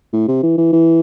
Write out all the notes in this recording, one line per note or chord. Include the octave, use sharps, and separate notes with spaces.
A2
C3
E3
E3
E3